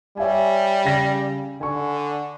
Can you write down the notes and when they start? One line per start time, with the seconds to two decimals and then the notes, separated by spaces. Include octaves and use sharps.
0.17 G3 C#5 E5 G#5
0.85 C#3 A#6
1.61 D3 G#5 C#6